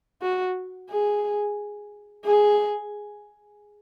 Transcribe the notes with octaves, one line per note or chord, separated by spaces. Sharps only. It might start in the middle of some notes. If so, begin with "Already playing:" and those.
F#4
G#4
G#4